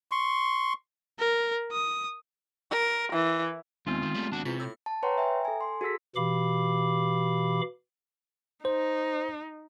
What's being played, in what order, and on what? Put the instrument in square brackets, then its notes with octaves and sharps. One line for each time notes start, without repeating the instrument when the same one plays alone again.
[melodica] C6 C#6
[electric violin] A#4
D#6
[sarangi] A#4
E3
[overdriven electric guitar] D#2 D#3 [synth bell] G#3 B3 C4 [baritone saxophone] F4
[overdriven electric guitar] D#3
G3 A3
[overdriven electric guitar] D#2 F#4 [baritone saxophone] D4
[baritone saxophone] E2 [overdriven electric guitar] C3 [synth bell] F4 B6
[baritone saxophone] A2 [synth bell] E6
[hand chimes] A5
B4 C#5 F#5 G5 A#5 C6
E5 G5 G#5 A#5
A4 G#5
C6
F#4 G#4 A4 E6 B6
[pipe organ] B2 E3 G4 F5 B5 D6
[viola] D#4 [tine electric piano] C5